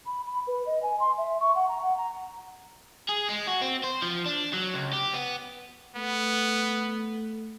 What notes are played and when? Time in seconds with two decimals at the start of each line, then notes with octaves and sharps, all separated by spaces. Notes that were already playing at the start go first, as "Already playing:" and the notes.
0.06 B5
0.26 B5
0.47 B4
0.66 D#5
0.82 G#5
0.99 C6
1.17 E5
1.40 C#6
1.55 F#5
1.68 A#5
1.82 F#5
1.97 A#5
3.09 G#4
3.29 G#3
3.47 F#4
3.62 C4
3.84 C5
4.03 F3
4.26 D4
4.53 F#3
4.74 C#2
4.93 G4
5.14 B3
5.96 A3 B3